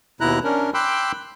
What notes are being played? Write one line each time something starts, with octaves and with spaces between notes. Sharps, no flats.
D#2 B2 E4 A#5 F#6
C#4 D4 A#4
G5 B5 C6 D6 E6 F#6